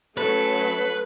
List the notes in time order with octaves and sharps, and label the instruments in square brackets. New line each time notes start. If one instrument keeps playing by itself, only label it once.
[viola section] F#3 A3 C#4 [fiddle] A4 [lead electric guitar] B4